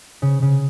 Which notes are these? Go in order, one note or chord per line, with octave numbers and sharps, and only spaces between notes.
C#3
C#3